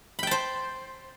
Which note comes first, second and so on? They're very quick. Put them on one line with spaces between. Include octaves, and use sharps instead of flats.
B5 G5 A5 C5